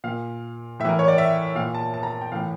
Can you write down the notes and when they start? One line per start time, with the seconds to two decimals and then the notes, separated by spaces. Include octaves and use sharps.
0.04 A#2 F5
0.80 A2 E5
0.85 E3 A#4
0.99 C#5
1.08 D5
1.18 E5
1.55 A#2 F5
1.75 A5
1.94 A5
2.03 A#5
2.12 A5
2.21 G5
2.32 A2 E3 F5